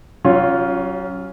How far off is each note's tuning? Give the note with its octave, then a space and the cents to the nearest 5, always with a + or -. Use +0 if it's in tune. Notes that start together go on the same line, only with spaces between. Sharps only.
F#3 +35 C#4 +0 F4 +0